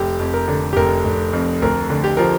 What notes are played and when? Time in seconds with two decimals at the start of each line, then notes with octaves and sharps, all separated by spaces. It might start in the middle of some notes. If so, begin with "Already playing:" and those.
Already playing: F1 G4
0.20 F2
0.34 A#4
0.48 D3
0.73 G4
0.76 F1 A#4
1.05 F1
1.33 F2
1.62 D2 A#4
1.90 D3
2.04 G4
2.17 F3 A#4